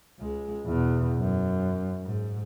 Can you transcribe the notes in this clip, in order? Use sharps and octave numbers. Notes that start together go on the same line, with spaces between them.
C#2 G#3
E2 B2
F#2
G#2